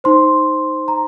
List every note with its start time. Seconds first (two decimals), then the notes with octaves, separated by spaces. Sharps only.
0.04 D#4 C5 C6
0.88 A#5